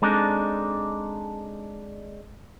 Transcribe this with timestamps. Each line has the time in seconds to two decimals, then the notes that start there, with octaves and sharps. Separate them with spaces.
0.02 G#3 C4 D4 D#4 A4 D5